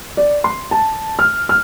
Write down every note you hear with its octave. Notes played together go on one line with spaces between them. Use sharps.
D5
C6
A5
F6
F6